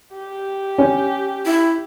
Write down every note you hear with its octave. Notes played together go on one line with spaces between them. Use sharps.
G4
C#4
E4